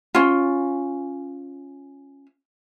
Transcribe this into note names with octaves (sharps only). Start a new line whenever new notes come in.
C#4 F4